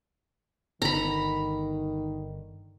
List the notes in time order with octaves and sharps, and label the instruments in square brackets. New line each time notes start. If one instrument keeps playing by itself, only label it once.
[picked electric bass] G1 D3 [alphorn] D#3 [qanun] A#5 B5